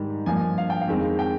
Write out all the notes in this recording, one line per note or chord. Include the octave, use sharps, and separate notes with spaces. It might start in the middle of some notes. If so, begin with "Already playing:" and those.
Already playing: G#2 D#3 G3
G2 F3 A#3 F4 G#5
F5
G5
F5
F2 D#3 G#3 C4
G5